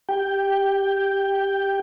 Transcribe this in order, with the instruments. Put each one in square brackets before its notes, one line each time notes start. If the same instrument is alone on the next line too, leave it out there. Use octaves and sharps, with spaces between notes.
[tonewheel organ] G4 G5